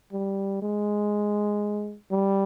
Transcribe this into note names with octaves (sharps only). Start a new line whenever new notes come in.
G3
G#3
G3